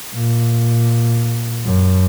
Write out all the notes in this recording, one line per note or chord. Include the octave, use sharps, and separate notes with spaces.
A#2
F#2